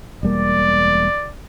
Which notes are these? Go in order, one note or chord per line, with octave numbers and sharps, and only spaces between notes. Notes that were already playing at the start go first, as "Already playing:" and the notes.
E1 G3 A#3 D5